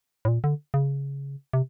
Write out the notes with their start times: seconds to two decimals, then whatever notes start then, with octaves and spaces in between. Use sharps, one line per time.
0.25 A2
0.28 A#2
0.44 D3
0.74 C#3
1.53 C3